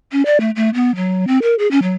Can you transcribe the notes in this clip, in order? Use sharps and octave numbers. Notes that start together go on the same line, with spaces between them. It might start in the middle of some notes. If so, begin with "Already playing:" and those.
C#4
D5
A3
A3
B3
F#3
C4
A#4
G#4
C#4
F#3